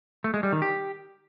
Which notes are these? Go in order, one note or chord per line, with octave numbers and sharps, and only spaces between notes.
A3
G#3
G3
D#3
G4